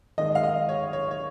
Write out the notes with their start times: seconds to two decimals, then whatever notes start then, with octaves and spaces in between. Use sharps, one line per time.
0.18 D#3 G#3 D#5
0.35 F5
0.43 D#5
0.69 C#5
0.93 C#5
1.11 C#5